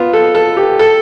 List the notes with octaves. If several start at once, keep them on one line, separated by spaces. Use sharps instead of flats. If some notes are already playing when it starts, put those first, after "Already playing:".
Already playing: B3 F4
A4
A4
G4
A4